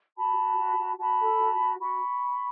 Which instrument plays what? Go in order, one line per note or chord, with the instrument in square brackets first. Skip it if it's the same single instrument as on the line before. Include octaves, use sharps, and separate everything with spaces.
[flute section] F#4 A5 B5
F#4
F#4
F#4
F#4 A5 B5
A4
F#4
F#4
F#4 B5 C#6